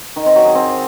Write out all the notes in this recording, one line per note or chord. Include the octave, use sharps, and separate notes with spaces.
D#3
C4
F#3
G#4
C4